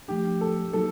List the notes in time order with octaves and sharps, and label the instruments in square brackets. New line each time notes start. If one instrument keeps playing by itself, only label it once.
[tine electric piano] F3 A3 D4 [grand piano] G4
[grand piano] A4
[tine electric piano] F#3 A#3 D#4 F#4 [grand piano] A4